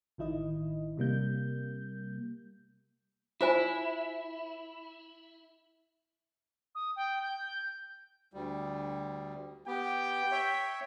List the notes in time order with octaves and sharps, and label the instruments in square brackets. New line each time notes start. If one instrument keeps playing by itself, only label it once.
[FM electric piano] A1 D#3 E4 D#5
C3 G3 A#3 G6
[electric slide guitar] E4 [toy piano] F4 C5 G#5
[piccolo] D#6
G5
G6
[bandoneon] D2 G3
[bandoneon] B3 G4 [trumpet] G5
[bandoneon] C#5 E5